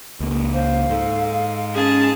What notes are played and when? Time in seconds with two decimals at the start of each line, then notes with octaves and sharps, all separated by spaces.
0.20 C#2 A#3
0.53 C5 F5
0.89 G#2 A4
1.75 C#4 G#4 A5